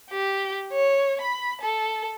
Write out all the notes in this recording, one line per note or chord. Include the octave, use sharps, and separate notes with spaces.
G4
C#5
B5
A4